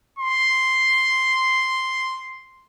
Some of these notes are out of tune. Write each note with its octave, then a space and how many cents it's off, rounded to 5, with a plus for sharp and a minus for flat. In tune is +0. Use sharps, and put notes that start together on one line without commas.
C6 +0